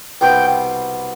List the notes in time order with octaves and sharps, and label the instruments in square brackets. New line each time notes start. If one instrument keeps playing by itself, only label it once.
[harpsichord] C2 B2 B3 [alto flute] G5